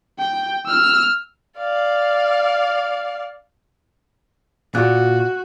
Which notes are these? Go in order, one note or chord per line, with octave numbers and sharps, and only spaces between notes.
G5
E6 F6
D5 F5
A#2 F#4 F#6